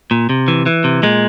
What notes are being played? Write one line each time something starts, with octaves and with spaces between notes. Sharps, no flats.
A#2
C3
E3
E3
C3
A#2 G#3